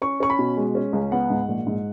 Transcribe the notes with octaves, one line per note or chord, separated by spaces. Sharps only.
C#4 C#6
C#4 C#6
B5
B2
G#3
C#4
C#2
B3 F#5
G#2
A#1
G#2